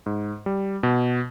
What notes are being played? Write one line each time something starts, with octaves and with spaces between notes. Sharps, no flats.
G#2
G3
B2